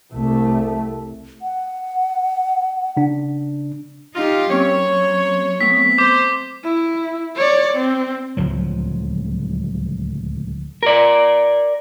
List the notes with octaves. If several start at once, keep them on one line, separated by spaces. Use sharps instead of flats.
C2 A3
F#5
C#3 D4
D#4 F4 G4
F#3 A#3 C4 C#4 C#5
A3 B3 C4 B6
C5 D6
E4
C#5 D5
C4
D1 C#2 F3 F#3
A#4 D5